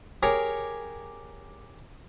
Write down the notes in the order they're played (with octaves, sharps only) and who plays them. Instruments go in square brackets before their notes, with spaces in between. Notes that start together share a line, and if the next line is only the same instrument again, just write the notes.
[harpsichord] G4 G#4 A#4 C#5 A#5